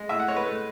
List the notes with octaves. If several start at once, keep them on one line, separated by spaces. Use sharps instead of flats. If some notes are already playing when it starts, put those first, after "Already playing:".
Already playing: G#3
A2 E5
F#5
G#3 C#5
B4
A3